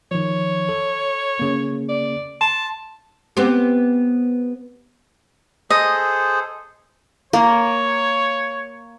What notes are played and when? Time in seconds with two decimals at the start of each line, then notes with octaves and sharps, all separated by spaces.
0.11 D#3 F3 C#5
0.69 A4
1.39 C#3 A#3
1.89 D5
2.41 A5 C6
3.37 B3 C4 G4
5.70 G#4 A4 C5 D#5
7.33 A#3 C#5